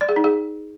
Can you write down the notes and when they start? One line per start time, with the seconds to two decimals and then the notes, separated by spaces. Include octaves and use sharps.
0.01 D5
0.09 G#4
0.16 D#4
0.24 G#4